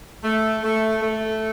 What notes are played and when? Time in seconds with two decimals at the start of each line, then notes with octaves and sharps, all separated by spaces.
0.23 A3
0.63 A3
1.02 A3